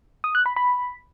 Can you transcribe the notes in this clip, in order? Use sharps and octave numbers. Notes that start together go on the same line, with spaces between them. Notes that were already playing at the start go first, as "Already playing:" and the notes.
D#6
F#6
B5
B5